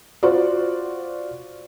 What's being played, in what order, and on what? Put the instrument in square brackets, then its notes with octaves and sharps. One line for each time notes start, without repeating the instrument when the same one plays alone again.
[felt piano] F4 F#4 C5 D5